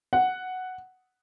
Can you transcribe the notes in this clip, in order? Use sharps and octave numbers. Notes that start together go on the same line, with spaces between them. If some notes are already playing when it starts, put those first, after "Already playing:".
F#5